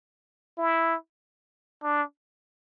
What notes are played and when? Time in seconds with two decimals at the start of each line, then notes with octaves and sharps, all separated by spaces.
0.58 E4
1.83 D4